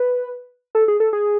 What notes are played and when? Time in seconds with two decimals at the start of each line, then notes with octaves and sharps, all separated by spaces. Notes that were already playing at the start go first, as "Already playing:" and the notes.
Already playing: B4
0.75 A4
0.88 G#4
1.00 A4
1.13 G#4